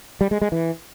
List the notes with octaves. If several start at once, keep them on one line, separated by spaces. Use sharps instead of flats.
G3
G#3
G#3
E3